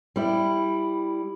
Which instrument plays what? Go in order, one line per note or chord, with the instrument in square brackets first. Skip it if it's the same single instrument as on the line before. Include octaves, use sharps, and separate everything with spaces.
[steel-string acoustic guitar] G3 E4